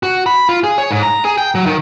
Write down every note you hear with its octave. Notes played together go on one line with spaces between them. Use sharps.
F#4
B5
F4
G#4
C#5
G#2
A#5
G#4
G5
F#3
D#3